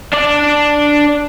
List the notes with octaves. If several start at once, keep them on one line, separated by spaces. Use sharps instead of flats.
D4 D5